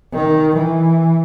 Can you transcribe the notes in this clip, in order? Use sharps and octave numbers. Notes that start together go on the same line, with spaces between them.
D#3
E3